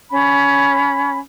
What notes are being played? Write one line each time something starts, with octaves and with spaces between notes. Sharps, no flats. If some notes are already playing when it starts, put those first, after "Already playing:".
C#4 B5